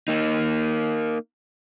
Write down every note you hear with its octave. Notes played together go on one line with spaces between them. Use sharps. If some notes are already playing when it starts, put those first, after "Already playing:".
A#3 D#4